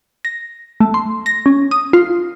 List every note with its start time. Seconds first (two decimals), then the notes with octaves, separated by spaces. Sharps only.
0.25 A#6
0.80 A3
0.94 C6
1.26 A#6
1.46 C#4
1.71 D#6
1.93 F4